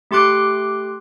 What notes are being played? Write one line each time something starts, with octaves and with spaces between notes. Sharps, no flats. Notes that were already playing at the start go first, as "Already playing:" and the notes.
A3 G4 C6 D6 F#6